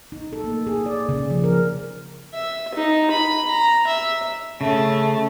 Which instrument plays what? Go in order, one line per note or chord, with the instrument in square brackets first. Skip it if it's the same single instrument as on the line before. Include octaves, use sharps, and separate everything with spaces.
[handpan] D#4
A4
A#3
G#4
D5
C#3
F3
A#4
[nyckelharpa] E5
D#4
B5
A#5
E5
[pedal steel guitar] C#3 [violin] A3